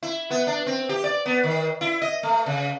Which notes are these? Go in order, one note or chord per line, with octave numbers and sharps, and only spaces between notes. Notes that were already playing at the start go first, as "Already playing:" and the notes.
E4
B3
D4
C4
G4
D5
B3
D#3
E4
D#5
A3
C#3